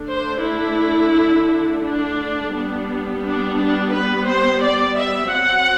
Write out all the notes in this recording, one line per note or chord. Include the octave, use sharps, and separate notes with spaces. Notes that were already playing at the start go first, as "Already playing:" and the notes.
Already playing: D3 A3 D4
C5
E4
D4
G3 B3 D4
D4
D4
B4
C5
D5
E5
F#3 C4 F#5